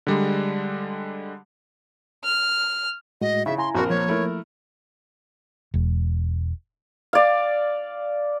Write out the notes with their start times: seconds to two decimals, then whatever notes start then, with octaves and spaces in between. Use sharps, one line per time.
0.07 D3 G3 G#3
2.24 F6
3.21 A2 G#3 F#4 D#5
3.46 C#3 D#4 E4 G#4 E5
3.58 E4 G#5 A#5 C6
3.75 A#1 C4 F#4 A#4
3.90 F3 A#3 C#5
4.08 A3 E4 A#4
5.74 E1
7.13 D5 F5